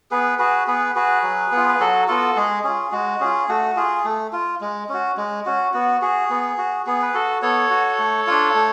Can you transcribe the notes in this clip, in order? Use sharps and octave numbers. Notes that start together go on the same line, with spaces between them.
B3 G#4 B4
F#4 G#4 B4
B3 G#4 B4
F#4 G#4 B4
F#3
B3 F4
B4
F#3 F#4 A4
B3 F4 F#4 A4
G#3 G#4
C#4 F4 G#4
G#3 F#4
C#4 F4 G#4
A3 F#4
F4 G#4
A3
F4
G#3
C#4 F#4
G#3
C#4 F#4
B3 F#4
F#4 G#4
B3
F#4
B3 G#4
B4
F#4 A4
B3 A4 C#5
F#4
A3
D4 F4
A3